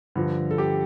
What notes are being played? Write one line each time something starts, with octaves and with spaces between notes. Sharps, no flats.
G2 D3 F3
A4
G4